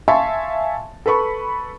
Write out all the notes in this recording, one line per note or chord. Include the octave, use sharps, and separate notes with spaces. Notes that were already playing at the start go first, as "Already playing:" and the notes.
E5 F5 G#5 A5 C6 C#6
A4 B4 B5 C#6